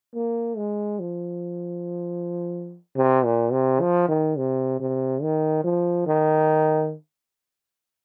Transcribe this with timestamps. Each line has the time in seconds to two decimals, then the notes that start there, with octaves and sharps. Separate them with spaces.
0.15 A#3
0.57 G#3
1.00 F3
2.96 C3
3.25 A#2
3.52 C3
3.81 F3
4.09 D#3
4.37 C3
4.80 C3
5.22 D#3
5.64 F3
6.07 D#3